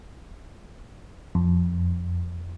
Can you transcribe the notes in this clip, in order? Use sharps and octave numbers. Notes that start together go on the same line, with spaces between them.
F2